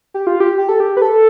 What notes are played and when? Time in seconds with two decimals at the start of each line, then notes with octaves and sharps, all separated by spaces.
0.14 G4
0.27 F4
0.40 G4
0.58 G4
0.69 A4
0.80 G4
0.97 B4
1.02 A4